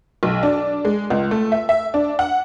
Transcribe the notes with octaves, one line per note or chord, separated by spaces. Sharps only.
B1
D4
G#3
C#2
A3
E5
E5
D4
F#5